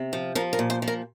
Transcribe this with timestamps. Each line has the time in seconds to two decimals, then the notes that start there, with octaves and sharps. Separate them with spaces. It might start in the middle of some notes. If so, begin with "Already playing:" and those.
Already playing: C3
0.13 F3
0.35 F3 A#4
0.53 A#4
0.59 A#2
0.70 C5
0.82 F3
0.88 A#4